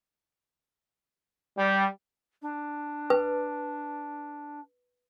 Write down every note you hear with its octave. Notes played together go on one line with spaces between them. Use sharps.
G3
D4
B4